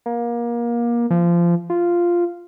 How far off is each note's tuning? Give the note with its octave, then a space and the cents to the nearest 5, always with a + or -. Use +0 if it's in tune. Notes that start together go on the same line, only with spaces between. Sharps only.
A#3 +25
F3 -25
F4 -5